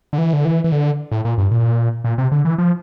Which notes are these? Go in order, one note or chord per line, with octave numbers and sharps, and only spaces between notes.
D3
E3
D3
E3
E3
D3
A2
A#2
G2
A#2
A#2
C3
D3
E3
F3